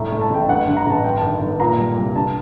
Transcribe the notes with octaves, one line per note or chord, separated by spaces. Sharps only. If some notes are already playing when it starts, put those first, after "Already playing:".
Already playing: G1 A2 A#5
A3
A5
A1 G5
G2 F#5
D3
A#5
A1 A5
G2 G5
D#3 A5
G1
A#2 A#5
G3
C2
D3 A5